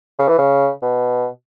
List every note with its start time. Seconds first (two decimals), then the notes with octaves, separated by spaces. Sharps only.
0.19 C#3
0.29 E3
0.38 C#3
0.83 B2